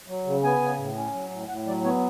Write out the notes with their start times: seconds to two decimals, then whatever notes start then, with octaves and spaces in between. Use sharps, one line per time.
0.08 F#3
0.26 C#3
0.43 B3 G#5
0.62 C#3
0.78 A2
0.96 C#4
1.14 F#3
1.31 A2
1.49 A2 F#5
1.66 F#3 D5
1.84 B3 C#5